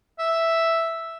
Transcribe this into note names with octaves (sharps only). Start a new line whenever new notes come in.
E5